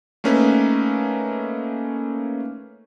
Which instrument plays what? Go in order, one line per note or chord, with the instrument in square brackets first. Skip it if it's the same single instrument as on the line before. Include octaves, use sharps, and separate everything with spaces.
[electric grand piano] A3 A#3 C#4 D#4 B4